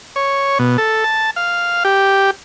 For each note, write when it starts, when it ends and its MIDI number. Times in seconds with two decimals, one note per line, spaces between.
0.16 0.58 73
0.59 0.77 47
0.78 1.04 69
1.04 1.30 81
1.36 1.84 77
1.85 2.31 67